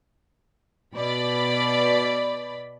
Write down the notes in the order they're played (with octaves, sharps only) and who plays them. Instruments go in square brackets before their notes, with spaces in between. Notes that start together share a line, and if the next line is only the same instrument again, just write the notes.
[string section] B2 D5 B5